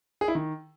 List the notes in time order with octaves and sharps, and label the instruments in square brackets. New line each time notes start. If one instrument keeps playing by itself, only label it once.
[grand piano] G#4
E4
D#3